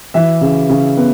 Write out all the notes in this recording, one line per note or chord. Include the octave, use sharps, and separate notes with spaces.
E3 E5
C#3
C#3
B3